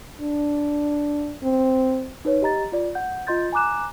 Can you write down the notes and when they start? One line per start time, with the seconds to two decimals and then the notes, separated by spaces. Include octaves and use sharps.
0.21 D4
1.43 C4
2.25 D#4 B4 C#5
2.42 G4 D#5 A#5 A6
2.72 F4 D5
2.95 F#5 G6
3.27 F4 D#5 C6 G6 A6
3.52 G#5 A#5 D6 F#6 E7